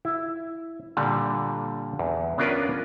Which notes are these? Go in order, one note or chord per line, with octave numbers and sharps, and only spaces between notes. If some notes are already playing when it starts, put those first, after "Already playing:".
E4
A#2 D3 G3
E2
B3 C#4 D4 F4 A#4 B4